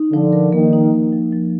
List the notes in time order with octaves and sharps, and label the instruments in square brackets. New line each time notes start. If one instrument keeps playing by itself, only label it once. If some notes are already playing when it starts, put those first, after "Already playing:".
Already playing: [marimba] D#4
[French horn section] D3 [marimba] F3
[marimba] A#4
[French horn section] D#3 [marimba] A#3
[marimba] D#4
A#4
F3
F3